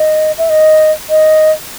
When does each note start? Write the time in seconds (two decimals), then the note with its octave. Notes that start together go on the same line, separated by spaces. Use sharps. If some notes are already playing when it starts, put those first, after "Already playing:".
Already playing: D#5
0.38 E5
0.49 D#5
1.10 D#5